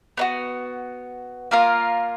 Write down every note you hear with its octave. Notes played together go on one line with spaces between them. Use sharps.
B3 D#4 F#4
A#3 F4 A#4 F5